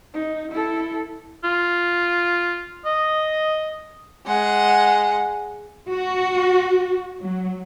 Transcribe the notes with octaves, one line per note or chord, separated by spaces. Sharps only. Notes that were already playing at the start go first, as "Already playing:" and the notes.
D#4
E4 A4
F4
D#5
G#3 F#5
F#4
F#3